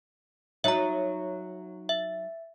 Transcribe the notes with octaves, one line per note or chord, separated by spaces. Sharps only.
F#3 D#4 E5 A#5
E5